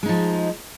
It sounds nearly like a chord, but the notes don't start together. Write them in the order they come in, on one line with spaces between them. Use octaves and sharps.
G#3 D#4 F3